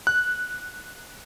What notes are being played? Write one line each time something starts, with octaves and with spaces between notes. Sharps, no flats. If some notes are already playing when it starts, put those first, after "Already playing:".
F#6